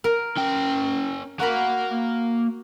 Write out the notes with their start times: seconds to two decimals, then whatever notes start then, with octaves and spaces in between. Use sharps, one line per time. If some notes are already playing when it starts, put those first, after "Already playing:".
0.04 A#4
0.37 C#4 G5
1.40 A#3 F#4 A#4 F5 B5